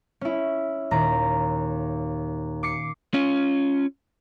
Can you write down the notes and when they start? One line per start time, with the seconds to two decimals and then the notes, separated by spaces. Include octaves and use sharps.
0.21 C#4 E4
0.91 D#2 A#2 A#5
2.63 D6 C7 C#7
3.14 C#4 F4